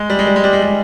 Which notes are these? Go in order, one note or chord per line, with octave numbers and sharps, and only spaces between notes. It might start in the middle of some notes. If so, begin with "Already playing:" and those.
Already playing: G#3
G3
G#3
G3
G#3
G3
G#3
G3